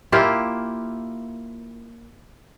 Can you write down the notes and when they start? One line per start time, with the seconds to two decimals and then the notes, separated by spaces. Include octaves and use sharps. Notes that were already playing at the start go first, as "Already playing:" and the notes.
0.12 A#3 E4 F4 G4